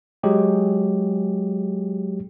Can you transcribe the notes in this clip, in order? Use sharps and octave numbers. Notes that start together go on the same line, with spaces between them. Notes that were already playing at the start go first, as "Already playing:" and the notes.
F#3 G#3 G4 G#4